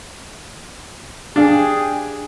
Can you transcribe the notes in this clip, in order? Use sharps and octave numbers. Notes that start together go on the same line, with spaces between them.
D4 G4 G#4 F5